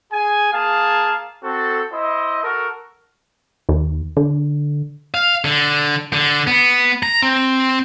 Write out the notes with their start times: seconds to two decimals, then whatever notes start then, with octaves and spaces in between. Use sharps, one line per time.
0.12 G#4 G#5
0.53 A#3 G#4 F5 A5
1.44 C4 F#4 A4
1.91 E4 C5 D#5
2.43 F#4 A4 A#4
3.69 D#2
4.17 D3
5.14 F5
5.45 D3
6.13 D3
6.47 B3
7.03 A#5
7.22 C4